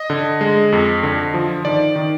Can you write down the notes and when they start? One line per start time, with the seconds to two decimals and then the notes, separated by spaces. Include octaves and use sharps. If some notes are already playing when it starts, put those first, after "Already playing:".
Already playing: D#5
0.10 D3
0.41 G#3
0.72 F2
1.03 D3
1.34 F3
1.65 D#3 D5
1.96 D#3